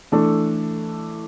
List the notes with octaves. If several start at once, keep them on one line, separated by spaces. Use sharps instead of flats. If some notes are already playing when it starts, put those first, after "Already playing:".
E3 A3 D4 A4